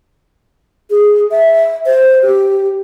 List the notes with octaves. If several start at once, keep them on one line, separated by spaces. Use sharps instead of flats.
G#4
E5
C5
G4